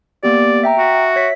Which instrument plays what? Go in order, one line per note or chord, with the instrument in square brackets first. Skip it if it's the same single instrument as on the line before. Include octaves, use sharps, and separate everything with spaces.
[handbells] A#3 B3 G4 [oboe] D5
[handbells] E5 G5 A#5
[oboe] F#4
[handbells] E5
C#5 B6